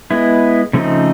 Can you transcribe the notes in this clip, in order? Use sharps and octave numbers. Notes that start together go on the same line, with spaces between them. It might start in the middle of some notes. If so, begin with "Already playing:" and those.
G#3 B3 E4
C#3 F3 A3 C4 D#4